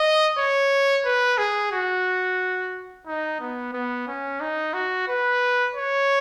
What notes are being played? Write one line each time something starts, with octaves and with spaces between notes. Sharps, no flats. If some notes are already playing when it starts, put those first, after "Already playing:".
Already playing: D#5
C#5
B4
G#4
F#4
D#4
B3
B3
C#4
D#4
F#4
B4
C#5